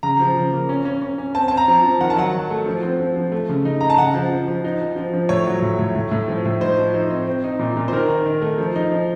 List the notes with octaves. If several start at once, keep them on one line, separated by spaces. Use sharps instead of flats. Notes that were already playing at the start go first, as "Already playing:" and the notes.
C#3 A#5
F3
C#3
A#3
C#4
C#4
C#4
C#4
C4 A5
C4 A5
A#5
F3
F3
D#3 F#5
A5
F#3 F#5
F#3
A3
F3
C4
F3
F3
A3
C#3
D#4
D#4 A#5
A5
C#3 F#5
F3
F3
F3
D#4
F3
F3
F3
A2 C#5
F#3
A2
A2
A2
A2
F3
A2
D#4 C5
F3
D#4
C4
C4
D#4
A#2
A#2
C5
D#3 A#4
D#3
D#3
A3
F3
D#4
F3